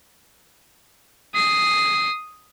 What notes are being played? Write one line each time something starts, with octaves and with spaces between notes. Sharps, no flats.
D#6 C7